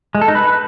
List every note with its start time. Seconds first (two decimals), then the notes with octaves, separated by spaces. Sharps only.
0.15 G#3
0.21 A4
0.28 D#4
0.35 B4